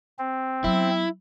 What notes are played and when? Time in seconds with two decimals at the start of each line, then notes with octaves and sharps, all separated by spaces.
0.19 C4
0.64 F#3 B3 E4